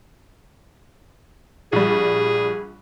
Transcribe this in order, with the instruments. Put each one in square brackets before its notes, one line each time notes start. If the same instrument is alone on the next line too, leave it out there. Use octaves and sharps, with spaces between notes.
[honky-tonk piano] A#1 G3 [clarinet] G#4